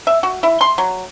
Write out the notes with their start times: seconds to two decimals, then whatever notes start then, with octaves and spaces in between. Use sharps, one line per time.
0.07 E5
0.23 F#4
0.43 E4
0.61 C6
0.78 F#3